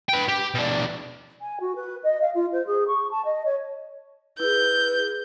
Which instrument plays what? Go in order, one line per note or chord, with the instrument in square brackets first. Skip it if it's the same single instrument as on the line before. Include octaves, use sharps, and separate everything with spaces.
[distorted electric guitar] B4 G5
G4
B2 D4
[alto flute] G#5
F#4
B4
D#5
F5
F4
C5
G#4
C#6
A5
D#5
C#5
[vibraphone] E4 G#4 [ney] B4 [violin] G6